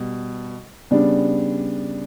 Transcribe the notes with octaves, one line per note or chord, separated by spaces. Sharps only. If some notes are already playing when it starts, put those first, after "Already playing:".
Already playing: B2 G3
C#3 G3 B3 D4